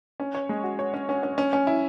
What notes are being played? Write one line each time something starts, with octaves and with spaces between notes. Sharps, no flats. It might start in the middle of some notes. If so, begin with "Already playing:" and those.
C#4
C#5
G#3
F#4
C#5
C#4
C#4
C#4
C#4
C#4
E4